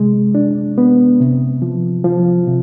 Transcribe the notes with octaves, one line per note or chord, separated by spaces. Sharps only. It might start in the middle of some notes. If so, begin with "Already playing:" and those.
Already playing: C3 G#3
D4
B3
C3
F3
F3
C3